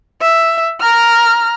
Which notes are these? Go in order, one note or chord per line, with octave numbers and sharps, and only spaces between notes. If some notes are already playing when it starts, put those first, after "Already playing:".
E5
A#5 F6